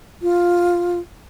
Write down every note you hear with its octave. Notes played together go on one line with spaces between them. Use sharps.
F4